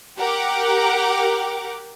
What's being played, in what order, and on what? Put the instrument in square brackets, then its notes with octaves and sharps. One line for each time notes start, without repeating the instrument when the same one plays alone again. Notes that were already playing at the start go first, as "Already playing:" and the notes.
[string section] G4 A#4 F#5 G5 D6